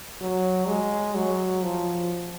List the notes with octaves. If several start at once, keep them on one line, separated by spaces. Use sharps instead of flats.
F#3
G#3
F#3
F3